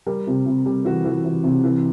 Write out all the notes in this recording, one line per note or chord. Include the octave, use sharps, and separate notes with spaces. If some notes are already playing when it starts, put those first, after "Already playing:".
G3 A#4
C3
C3
G3
E3 F#4
E3
E3
C3
E3